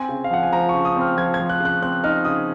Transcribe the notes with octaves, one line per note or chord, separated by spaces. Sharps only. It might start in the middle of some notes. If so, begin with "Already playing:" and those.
Already playing: C4 G#5
C#3
F5
F3 F#5
G#5
F3 A#5
C#6
C#3
D#6
C4 F6
F3 G#6
G#6
F3
F#6
C#3 F#6
C4 F#6
D#4 F6
C#3 D#6